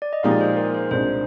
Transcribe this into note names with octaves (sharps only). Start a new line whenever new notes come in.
D5
D#5
A#2 F3 G#3 D#4 G4 F5
D5
C5
A#4
C5
C2 A#2 G#3 D4 C5